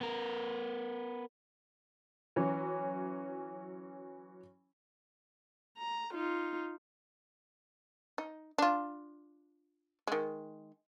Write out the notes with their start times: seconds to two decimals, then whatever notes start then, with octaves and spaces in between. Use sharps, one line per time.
0.01 B3 A#4
2.36 E3 F#3 C#4
5.78 A#5
6.13 D#4 F4
8.18 D#4
8.58 D4 F4
10.07 D#3 G#3